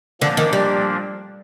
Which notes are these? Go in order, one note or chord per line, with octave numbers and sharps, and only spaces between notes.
A#2 D3 F3 A#3 D4
D#3
G3